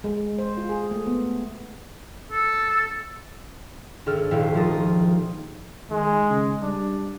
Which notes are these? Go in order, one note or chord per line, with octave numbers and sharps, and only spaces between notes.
G#3
C5
F4
G#4
A3
B3
A4
G#1 D4 A4 F6
D#1 E4 F5
F3 F4 A#4 D#6
D#3 G#3
C#3
G3 D4